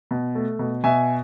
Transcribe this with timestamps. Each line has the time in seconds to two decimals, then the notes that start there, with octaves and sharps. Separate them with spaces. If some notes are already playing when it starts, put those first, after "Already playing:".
0.11 B2
0.35 A3
0.59 B2
0.84 B2 E5 G#5